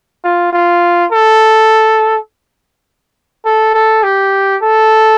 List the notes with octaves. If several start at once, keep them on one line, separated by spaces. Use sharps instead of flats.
F4
F4
A4
A4
A4
G4
A4